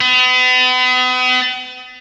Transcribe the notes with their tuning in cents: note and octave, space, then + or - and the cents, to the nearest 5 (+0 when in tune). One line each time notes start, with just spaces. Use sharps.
B3 +40